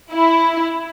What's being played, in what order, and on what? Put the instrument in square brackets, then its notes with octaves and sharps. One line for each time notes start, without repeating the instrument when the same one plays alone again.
[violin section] E4